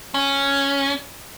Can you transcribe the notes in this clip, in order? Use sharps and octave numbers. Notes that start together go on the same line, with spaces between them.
C#4